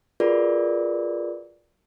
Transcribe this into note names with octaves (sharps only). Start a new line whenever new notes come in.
F4 F#4 G#4 A#4 B4 D5